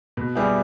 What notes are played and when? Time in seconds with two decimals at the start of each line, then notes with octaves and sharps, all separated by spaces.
0.17 B2
0.35 G3 B3 E4 G#4